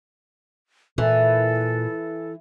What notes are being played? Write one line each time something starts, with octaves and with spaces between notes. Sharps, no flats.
A#2 E3 A4